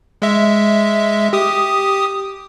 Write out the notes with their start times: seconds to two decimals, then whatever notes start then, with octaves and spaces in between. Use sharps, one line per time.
0.22 G#3 E5
1.33 G4 D#6